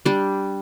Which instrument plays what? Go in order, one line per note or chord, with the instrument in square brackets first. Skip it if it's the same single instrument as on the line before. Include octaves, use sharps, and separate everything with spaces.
[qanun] G3 D4